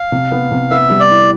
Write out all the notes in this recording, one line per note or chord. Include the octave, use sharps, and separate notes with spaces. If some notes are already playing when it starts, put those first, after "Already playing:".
Already playing: F5
C3
B3
C3
B3 E5
G3
D5
E4